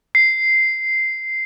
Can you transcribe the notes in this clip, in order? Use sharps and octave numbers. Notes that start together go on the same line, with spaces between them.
C7